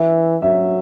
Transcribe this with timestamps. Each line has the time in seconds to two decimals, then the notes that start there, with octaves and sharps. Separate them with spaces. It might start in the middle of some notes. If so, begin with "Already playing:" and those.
Already playing: E3 E5
0.42 F#3 E5